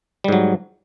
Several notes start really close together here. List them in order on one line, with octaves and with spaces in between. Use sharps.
G3 G#2 F#3